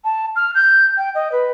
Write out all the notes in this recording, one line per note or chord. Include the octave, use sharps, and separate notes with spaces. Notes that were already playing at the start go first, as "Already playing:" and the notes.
A5
F6
G6
G5
D#5
B4